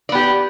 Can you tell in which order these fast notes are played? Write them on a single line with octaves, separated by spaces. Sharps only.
D5 B3 G4